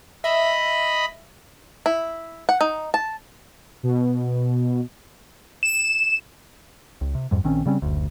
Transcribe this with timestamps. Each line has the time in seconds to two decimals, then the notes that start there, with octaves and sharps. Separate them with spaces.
0.24 D#5 E5 B5
1.86 E4
2.49 F#5
2.61 D#4
2.94 A5
3.83 B2
5.63 E7
7.01 C#2
7.15 C3
7.31 F2 G#2 G3
7.44 A#1 D#3 C4 C#4
7.66 C#3 G3 C4 C#4
7.82 F#1 D2